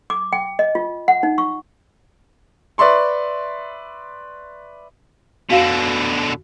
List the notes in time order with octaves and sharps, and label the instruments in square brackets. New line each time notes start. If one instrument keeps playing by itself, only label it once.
[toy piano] D6
G5
D#5
F4
F#5
D#4
C#6
[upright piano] B4 D5 E5 C6 C#6
[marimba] F2 F#4 F5 [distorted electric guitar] B2 D3